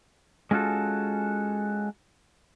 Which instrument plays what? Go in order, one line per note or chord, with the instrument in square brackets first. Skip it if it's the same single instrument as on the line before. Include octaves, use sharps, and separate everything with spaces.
[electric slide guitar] G#3 C#4 F4 F#4 A4